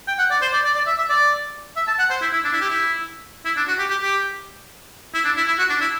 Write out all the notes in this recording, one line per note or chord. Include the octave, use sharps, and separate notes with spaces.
G5
F#5
D5
C5
D5
D5
D5
E5
E5
D5
E5
A5
F#5
C5
E4
E4
D4
E4
G4
E4
E4
D4
F#4
G4
G4
G4
E4
D4
E4
E4
F#4
D4
E4